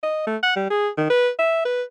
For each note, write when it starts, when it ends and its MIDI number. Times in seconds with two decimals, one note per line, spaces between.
0.03 0.22 75
0.27 0.37 57
0.43 0.51 78
0.56 0.68 55
0.70 0.88 68
0.98 1.06 51
1.10 1.29 71
1.38 1.63 76
1.65 1.83 71